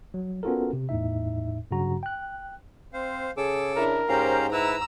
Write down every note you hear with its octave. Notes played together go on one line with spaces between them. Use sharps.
F#3
B3 C#4 F4 F#4 A4 A#4
C3
E2 A2 D#4 E5
G2 C#3 F#3 F#4 A#5
G5 F#6
C4 C5 F5
C#3 G#4 A4 D6 E6
D4 E4 A#4
G#2 C#4 G4 C5 F5 A#5
E4 B4 A#5 E6